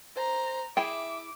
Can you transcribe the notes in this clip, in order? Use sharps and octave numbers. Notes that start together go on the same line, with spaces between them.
C5 A#5
E4 G#4 E5 G5 D6